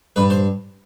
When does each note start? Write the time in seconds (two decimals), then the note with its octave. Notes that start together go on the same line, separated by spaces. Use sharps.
0.16 G2 B4
0.30 C5